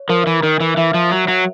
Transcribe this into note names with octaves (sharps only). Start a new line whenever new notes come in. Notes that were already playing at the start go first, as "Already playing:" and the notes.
Already playing: C#5
F3 A#4
E3
D#3 A#4
E3
E3 E5
F3
F#3 C#5
F#3